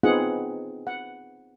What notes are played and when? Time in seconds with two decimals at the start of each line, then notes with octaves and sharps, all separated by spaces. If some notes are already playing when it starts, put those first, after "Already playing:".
0.03 B3 C4 D#4 F4 G#4 F#5
0.87 F#5